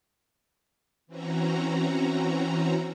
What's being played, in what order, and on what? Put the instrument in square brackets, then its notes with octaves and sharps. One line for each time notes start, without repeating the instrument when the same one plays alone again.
[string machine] E3 C4 C#4 F#4 A#5